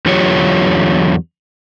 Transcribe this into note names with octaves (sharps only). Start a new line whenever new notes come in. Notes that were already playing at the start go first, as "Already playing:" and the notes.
E2 D3 F#3 F4 G4 C#5